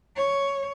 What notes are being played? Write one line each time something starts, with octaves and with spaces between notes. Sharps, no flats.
C#5